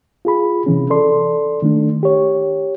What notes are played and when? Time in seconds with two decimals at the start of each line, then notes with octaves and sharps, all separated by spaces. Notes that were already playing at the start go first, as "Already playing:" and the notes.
0.25 F4 G#4 B5
0.66 C3 E3 C#4
0.90 A4 D5 C6
1.62 D#3 A3 D4
2.03 G4 C#5